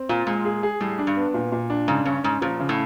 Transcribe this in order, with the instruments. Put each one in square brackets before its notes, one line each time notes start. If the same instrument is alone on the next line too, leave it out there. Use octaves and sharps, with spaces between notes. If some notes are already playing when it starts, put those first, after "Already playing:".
Already playing: [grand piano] C4
[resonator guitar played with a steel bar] A#2 [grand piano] F4
[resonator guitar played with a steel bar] A#2 [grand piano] G#3
[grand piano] G#4
G#4
[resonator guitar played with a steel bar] A2 [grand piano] G3
[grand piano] D4
[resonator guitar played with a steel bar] G2
[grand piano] B3
A#2
A#2
D4
[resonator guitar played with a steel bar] G#2 [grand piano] C#3
[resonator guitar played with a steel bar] G2 [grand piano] C#4
[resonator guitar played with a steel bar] G#2 [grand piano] C#4
[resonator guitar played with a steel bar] A#2 [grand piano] F3
[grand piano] C#3
[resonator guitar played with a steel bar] A2